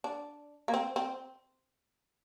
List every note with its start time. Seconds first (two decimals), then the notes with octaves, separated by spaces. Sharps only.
0.04 D4
0.68 A#3
0.74 C4
0.96 C4